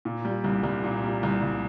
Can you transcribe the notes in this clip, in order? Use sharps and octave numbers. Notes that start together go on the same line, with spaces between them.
A#2
G3
C2
C2
A#2
G3
C2
C2